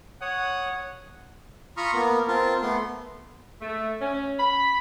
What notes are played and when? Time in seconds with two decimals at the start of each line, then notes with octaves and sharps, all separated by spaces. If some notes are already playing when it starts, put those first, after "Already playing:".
0.21 C#5 F#5 D#6
1.77 F4 A#5 B5 C#6 D#6 F6
1.94 A#3 B3 A#4
2.28 C4 F4 A#4 A5
2.62 A3 B3 C6
3.61 A3
4.01 C#4
4.39 B5